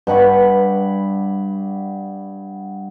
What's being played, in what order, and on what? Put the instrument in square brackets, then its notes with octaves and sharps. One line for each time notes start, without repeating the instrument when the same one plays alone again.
[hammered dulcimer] G2 F#5 B5 C#6